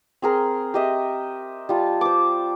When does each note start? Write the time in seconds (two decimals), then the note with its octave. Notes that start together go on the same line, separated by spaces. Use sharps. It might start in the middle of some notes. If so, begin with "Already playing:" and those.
0.22 C4 G#4 A#4
0.74 G4 D#5 E5
1.69 G3 F4 A5
2.01 C5 D6